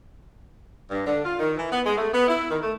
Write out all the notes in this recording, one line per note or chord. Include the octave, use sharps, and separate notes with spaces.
G2
D3
F4
D#3
E3
B3
G#3
A3
B3
E4
D#3
A3